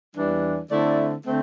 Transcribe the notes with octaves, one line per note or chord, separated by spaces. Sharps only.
E2 E3 G3 D4
D3 A3 C4 E4 D5
D3 A3 C4